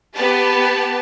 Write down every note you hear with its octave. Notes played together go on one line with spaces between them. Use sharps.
B3 G4 B4 A5